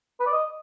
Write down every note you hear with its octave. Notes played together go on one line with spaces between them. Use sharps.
B4
D5
D#5